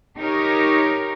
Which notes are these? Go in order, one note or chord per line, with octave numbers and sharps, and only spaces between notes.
D#4 G4 A#4 C#5